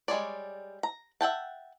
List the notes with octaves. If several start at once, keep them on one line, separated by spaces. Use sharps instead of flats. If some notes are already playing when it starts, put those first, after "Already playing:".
G3 G#3 C#5 D5
A#5
E5 F#5 G5 A5